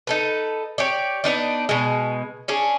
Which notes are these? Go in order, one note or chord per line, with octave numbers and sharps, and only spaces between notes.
D#4 A4 B4
G4 C#5 D5
B3 D4 D#4 D5
B2 G#3
C#4 D4 G#4